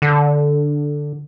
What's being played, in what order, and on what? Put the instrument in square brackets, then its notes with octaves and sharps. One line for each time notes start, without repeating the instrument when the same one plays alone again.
[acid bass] D3